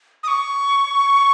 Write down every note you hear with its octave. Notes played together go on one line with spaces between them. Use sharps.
D#6
C#6